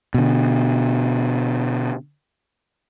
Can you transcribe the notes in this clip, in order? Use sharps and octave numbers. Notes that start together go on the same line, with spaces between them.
B2 D3